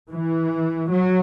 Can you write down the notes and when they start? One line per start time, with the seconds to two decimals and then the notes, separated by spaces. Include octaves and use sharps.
0.10 E3
0.90 F#3